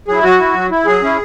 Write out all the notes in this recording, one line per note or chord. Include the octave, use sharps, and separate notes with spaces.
F#3 E4 G#4
F#3 F#4
E4
F#3
E4
F#3 G#4
C#4 E4